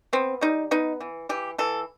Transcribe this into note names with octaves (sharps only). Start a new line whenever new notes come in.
B3 C4
G3 D#4
B3 D#4
E3
E3 G4
E3 A4